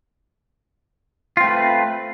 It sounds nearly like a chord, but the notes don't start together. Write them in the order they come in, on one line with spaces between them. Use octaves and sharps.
F4 C4 A3 B4